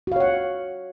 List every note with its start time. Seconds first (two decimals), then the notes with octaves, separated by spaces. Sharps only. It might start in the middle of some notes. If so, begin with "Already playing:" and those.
0.07 F#4
0.12 F5
0.16 C#5
0.20 F#5